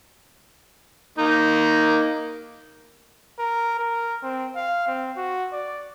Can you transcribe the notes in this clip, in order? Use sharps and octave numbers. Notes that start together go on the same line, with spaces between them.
A#3 D#4
A#4
A#4
C4
F5
C4
F#4
D5